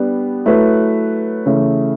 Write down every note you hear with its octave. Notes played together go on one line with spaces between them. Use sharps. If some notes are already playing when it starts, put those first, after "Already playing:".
Already playing: G3 B3 D4
F#3 A3 E4 B4
C#3 E3 A3